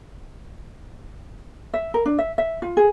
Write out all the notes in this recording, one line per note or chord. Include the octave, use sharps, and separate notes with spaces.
E5
A#4
D4
E5
E5
F4
G#4